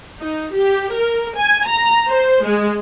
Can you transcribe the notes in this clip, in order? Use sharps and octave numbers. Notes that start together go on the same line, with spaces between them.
D#4
G4
A#4
G#5
A#5
C5
G#3